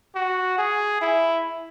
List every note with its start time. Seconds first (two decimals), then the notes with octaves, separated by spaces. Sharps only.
0.15 F#4
0.58 G#4
1.01 E4